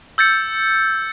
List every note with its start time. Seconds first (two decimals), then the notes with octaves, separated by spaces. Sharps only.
0.18 E6 G6 A6 C#7